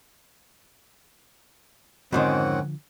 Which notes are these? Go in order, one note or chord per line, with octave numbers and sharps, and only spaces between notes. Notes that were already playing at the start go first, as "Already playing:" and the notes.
F2 G#2 D3 D#3 F3 C4 C#4 F#5